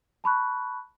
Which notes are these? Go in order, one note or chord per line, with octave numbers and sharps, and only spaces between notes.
A5 B5 C#6 F#6